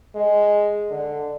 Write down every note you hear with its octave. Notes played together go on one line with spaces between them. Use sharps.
G#3
D3